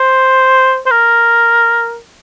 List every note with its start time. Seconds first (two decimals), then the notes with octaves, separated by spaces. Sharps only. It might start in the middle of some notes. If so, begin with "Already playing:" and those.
Already playing: C5
0.86 C5
0.91 A#4